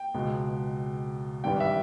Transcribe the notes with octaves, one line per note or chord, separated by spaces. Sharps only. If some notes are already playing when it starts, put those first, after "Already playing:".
Already playing: G5
C#2 B2 G#3
G#1 G2 E3 G3 B3 G5
E5